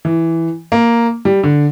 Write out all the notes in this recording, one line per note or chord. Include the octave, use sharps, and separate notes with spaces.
E3
A#3
G3
D3